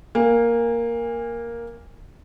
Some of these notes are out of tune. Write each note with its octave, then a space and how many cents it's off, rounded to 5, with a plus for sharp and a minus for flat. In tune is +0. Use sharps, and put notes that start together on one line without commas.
A#3 +0 G#5 -30